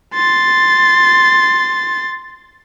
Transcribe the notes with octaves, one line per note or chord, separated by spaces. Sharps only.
C6 A6